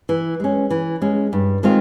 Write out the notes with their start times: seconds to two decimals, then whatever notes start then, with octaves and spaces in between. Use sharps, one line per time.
0.09 E3
0.40 G#3 C#4
0.70 E3
1.01 G#3 C#4
1.33 G2
1.63 D#3 G#3 C4 F4